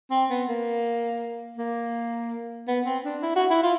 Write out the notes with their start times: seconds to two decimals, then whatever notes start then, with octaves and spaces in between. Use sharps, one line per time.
0.11 C4
0.30 B3
0.48 A#3
1.58 A#3
2.68 B3
2.86 C4
3.04 D4
3.22 E4
3.36 F#4
3.50 E4
3.64 F4